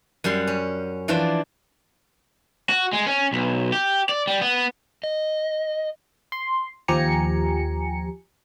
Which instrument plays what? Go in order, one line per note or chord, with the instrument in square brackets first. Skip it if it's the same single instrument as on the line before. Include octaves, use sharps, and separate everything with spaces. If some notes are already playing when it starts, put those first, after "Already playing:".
[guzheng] F#2 G3 F#5 C6
C#4
E3 F3 D4 F4 D5
[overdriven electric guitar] F#4
G#3
C#4
B1
G4
D5
G3
B3
[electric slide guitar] D#5
[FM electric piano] C6
D#2 F3 G4 G#5 A#5 C#7